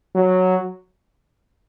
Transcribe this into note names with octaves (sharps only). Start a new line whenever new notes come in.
F#3